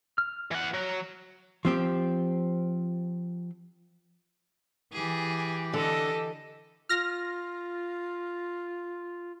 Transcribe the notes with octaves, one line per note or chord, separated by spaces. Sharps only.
F6
E3 F#5
F#3
F3 C4 G4
E3 G4 G#4
D3 A4 D#5
F4 F6 A#6